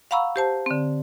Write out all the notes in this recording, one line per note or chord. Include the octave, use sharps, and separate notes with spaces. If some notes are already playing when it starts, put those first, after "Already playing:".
F5 F#5 A#5 B5 C#6 E6
G4 C5 A5
D3 C4